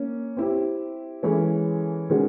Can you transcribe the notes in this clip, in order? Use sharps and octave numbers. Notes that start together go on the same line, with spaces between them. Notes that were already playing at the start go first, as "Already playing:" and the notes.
Already playing: A#3 C#4
C4 E4 G4
E3 G#3 C#4 E4 A4
D#3 G#3 C#4 F#4